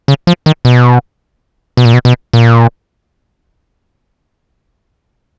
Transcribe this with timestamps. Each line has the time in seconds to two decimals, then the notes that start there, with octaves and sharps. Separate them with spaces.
0.08 C#3
0.27 F3
0.46 D#3
0.65 B2
1.77 B2
1.85 A#2
1.94 B2
2.05 B2
2.33 A#2